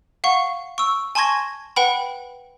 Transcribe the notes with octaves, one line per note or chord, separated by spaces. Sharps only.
F5 F#5 C#6
C#6 E6
G#5 A5 C6 C#6 G#6 A#6
B4 F#5 G5 B5